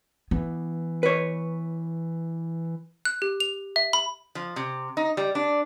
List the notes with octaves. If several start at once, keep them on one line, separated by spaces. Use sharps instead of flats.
E3 B3
B4 C#5
F#6
G4
F7
E5
B5
F3
C3
D#4
G3
D4